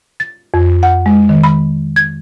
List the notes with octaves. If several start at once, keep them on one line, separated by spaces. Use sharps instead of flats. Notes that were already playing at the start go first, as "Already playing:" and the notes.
A6
F2
F#5
G#3
D#3
B5
G#6